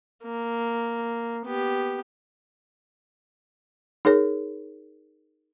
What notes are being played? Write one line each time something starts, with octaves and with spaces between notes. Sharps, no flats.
A#3
B3 G4
D#4 G#4 A#4 C#5